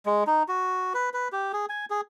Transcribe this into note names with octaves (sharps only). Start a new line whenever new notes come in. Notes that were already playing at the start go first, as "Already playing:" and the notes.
G#3
D#4
F#4
B4
B4
G4
G#4
G#5
G#4